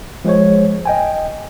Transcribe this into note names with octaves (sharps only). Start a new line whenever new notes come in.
F3 G#3 G#4 C5 C#5
D#5 G5 G#5